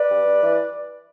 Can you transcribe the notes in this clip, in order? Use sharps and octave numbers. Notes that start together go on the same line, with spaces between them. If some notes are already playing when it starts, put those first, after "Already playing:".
Already playing: B4 D5
G2
G2
E3